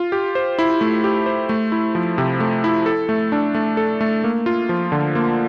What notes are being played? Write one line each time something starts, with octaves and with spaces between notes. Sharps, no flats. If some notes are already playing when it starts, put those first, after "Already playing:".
Already playing: F4
G4
C5
E4
A3
G4
C5
A3
E4
F3
C3
A3
E4
A4
A3
D4
A3
A4
A3
A#3
F4
F3
D3
A#3